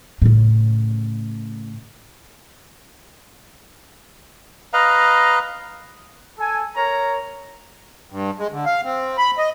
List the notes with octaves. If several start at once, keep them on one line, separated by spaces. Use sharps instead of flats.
A2 C#3
B4 D#5 F5 A#5
A4 G#5
A#4 C#5 A#5
G2
G#3
D3
F5
C4
B5
D#5